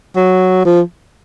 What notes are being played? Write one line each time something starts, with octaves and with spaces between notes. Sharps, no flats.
F#3
F3